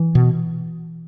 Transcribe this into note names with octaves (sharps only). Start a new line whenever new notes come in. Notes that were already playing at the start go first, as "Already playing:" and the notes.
Already playing: E3
B2